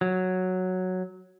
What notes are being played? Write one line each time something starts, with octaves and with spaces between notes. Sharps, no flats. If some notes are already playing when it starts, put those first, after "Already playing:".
F#3